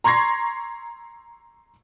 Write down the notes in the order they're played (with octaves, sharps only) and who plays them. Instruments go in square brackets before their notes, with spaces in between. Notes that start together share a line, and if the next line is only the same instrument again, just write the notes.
[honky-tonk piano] A#5 C6 C#6 G#6 A#6 C7